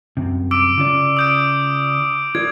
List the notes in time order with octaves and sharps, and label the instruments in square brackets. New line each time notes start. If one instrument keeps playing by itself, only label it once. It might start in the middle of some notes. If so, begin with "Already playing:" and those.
[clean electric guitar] C2 F#2 C3
[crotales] D6 E6 D7
[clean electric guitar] C#3 F4 D5
[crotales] D#6 G6 D7
[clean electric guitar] F4 A#4 D5 [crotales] G#6